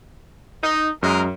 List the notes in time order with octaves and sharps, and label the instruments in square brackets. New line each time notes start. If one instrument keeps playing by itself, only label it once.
[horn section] D#4
[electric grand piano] F#2 [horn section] G#3 A#4